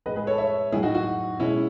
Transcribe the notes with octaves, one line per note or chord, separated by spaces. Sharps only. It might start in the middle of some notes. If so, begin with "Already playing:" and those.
A2 G#3 B4 D#5
G#4 B4
A4 C#5
C#5 E5
A2 F#3 E4 G#4
D#4 F#4
D#4 F#4
B2 G#3 C#4 E4